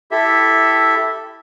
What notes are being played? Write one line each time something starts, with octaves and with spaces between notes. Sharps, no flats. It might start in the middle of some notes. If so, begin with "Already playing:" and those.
E4 G4 A4 E5